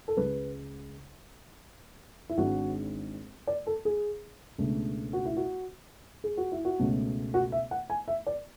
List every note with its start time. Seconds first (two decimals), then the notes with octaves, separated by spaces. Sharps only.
0.08 A4
0.17 C#2 C#3 G#3 B4
2.30 E4
2.37 G#1 G#2 G#3 D4 F#4
3.47 D5
3.67 A4
3.85 G#4
4.58 C#2 B2 A3 D4
5.13 F#4
5.26 E4
5.37 F#4
6.24 G#4
6.37 F#4
6.52 E4
6.65 F#4
6.79 C#2 B2 A3 C#4
7.34 F#4
7.52 E5
7.71 F#5
7.90 G#5
8.08 E5
8.27 D5